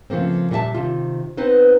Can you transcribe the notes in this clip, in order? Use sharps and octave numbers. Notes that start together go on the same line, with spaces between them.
C#3 F3 A3 A#3 C4
A#2 G3 F#4 D5 E5 A5
C3 D#3 F4
B3 C4 D#4 B4 C5